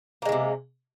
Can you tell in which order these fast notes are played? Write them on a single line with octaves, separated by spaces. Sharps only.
A#3 G#3 D#3 C3